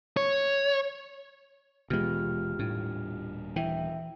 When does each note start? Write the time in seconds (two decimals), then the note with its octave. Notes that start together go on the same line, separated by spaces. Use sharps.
0.17 C#5
1.90 D#1 B2 E3 G#3 F4 G4 F6
2.59 D#1 A2 G3 D4
3.56 E3 E5 G5